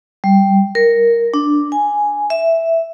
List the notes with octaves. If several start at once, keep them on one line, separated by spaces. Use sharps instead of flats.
G3
A#4
D4
G#5
E5